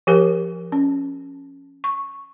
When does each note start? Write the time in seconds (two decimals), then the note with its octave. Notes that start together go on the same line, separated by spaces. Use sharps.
0.07 F3 G4 A#4
0.72 C#4
1.84 C#6